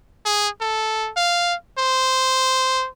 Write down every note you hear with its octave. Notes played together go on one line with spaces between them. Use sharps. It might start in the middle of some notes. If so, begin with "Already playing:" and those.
G#4
A4
F5
C5